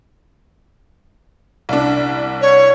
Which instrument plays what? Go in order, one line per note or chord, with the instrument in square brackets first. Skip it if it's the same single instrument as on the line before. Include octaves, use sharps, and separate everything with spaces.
[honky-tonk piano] C2 D4
[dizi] C#5